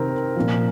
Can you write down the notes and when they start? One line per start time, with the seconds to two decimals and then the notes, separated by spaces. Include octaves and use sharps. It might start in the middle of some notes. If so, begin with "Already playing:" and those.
Already playing: C3 D#3 C4 A#4
0.36 A#2 F3